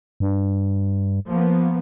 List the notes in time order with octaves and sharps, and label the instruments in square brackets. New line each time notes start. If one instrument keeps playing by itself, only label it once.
[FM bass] G2
[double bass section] F3 A#3 B3